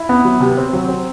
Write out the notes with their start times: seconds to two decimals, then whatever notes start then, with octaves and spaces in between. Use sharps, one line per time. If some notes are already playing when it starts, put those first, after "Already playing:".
Already playing: E4
0.09 B3
0.25 F#3
0.40 C3
0.57 C4
0.73 F#3
0.88 C4